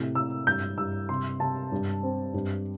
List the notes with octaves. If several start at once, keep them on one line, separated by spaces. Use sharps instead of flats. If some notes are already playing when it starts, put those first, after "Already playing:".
Already playing: A2 C3
A2 E6
G2 G6
G2 E6
C3 C6
C3 A5
G2
C4
G2